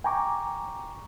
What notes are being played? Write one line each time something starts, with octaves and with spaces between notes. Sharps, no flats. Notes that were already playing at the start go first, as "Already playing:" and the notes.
G5 G#5 A#5 C#6 D6